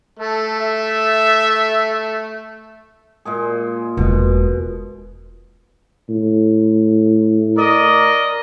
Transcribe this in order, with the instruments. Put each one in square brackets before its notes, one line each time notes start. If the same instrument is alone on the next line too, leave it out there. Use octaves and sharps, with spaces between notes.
[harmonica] A3 [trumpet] A4
[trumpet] E5
[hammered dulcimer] A#2 G#3 G#4
[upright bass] E1 [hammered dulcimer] B2
[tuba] A2
[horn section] A#4 D5 D#5